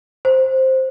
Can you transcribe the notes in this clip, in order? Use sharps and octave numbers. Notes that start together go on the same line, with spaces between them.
C5